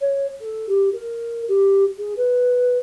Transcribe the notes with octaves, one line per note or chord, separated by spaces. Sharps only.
C#5
A4
G4
A#4
G4
G#4
B4